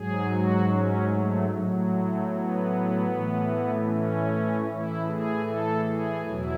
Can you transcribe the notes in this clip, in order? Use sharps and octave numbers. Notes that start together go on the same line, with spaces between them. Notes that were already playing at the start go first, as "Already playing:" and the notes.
Already playing: G#2 F#3 G#4
F#4
C#4
A3
A2 F#3
A3
B3
A2 E3
C#4
A2 E3 E4
G#4
A4
G#4
E2 B2 F#3 E4